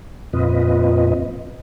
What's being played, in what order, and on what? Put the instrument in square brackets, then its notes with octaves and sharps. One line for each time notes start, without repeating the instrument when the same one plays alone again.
[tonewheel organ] F2 A#2 C4 F4 B4 D#5